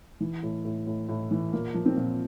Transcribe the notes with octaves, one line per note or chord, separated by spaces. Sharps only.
E3
A2
A2
A2
A2
E3
A#2 A#3
F3
C4
A#2